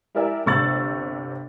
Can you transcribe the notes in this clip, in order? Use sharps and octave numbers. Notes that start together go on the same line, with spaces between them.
E4 G4 A#4 D5 E5 G#5
G1 C3 C#6 E6 A6 F#7